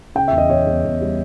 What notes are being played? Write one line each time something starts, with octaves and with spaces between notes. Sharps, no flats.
C#3 G5
E2 E5
D#5
E2 C#5
E2
E2
G3